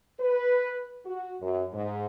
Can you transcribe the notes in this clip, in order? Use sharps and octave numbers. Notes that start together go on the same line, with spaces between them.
B4
F#4
F#2
G#2